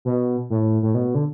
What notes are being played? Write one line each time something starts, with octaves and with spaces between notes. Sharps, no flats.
B2
A2
A2
B2
D3